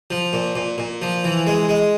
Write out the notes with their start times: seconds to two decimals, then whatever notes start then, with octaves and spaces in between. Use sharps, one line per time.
0.10 F3
0.33 A#2
0.56 A#2
0.78 A#2
1.02 F3
1.24 E3
1.47 G#3
1.69 G#3